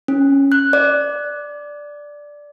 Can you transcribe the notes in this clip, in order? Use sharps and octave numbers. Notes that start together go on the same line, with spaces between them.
C#4
F#6
D5